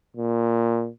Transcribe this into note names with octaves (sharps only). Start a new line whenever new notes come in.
A#2